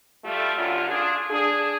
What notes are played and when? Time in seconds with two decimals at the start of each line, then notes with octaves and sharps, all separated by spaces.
0.25 G3 A3 F4
0.57 F#2 D3 F4
0.89 D4 F4 G#4
1.30 D4 G#4